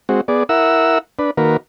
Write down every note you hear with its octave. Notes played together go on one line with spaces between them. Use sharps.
G#3 C4 F#4
B3 G#4 D5
E4 A#4 F#5 E6
D4 B4
D#3 A#3 F#4 A#4 B4